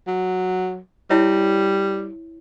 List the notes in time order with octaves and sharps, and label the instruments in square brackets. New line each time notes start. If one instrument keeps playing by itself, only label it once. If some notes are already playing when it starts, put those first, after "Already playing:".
[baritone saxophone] F#3
[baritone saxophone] G3 [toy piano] E4 C#5 E5